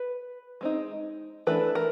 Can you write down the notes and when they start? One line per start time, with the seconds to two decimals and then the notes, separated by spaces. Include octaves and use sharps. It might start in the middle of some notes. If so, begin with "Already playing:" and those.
Already playing: B4
0.61 G#3 C4 D#4
1.47 E3 A3 D4 B4
1.75 A#4